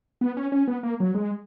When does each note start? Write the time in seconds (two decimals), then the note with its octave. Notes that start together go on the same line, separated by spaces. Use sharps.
0.21 B3
0.37 C#4
0.52 C#4
0.67 B3
0.83 A#3
1.00 F#3
1.15 G#3